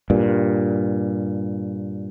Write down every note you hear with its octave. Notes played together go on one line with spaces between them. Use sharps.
G2 A#2